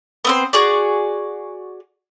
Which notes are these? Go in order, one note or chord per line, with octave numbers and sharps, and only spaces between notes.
B3 C4 C5
F#4 G#4 D5